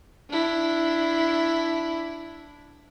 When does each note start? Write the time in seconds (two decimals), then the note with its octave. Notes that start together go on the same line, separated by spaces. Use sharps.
0.30 D4 E4